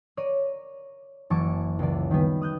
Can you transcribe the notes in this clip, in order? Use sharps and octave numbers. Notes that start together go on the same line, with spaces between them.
A#4 C#5 D5 D#7
F#1 E3 E4 A5 C#6 D6
C#2 E3 D5
D#3 G3 B3
D#6 F#6 G6